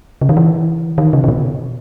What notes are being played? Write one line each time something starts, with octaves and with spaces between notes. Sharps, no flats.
C#3
D#3
E3
D#3
C#3
C#3
B2